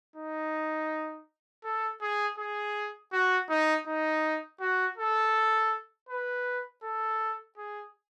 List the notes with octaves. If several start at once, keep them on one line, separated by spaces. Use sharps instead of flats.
D#4
A4
G#4
G#4
F#4
D#4
D#4
F#4
A4
B4
A4
G#4